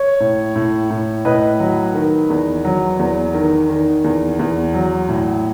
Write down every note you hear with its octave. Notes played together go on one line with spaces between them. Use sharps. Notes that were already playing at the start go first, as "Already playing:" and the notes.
Already playing: C#5
A2
A2
A2
A2 B4 D#5
F#3
D#3
E2
F#3
E2
D#3
D#3
E2
E2
F#3
A2